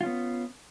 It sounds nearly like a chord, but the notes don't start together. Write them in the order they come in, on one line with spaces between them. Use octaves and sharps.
F4 C#4 B3